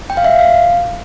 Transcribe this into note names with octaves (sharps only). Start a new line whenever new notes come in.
G5
F5
E5
F5